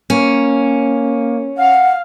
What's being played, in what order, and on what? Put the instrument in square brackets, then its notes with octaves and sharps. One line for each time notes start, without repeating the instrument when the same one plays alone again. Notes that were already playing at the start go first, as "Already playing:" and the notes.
[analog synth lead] A#3 [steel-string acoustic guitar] C#4
[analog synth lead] F5 [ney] F#5